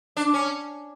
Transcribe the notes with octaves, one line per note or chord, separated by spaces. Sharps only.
D4
C#4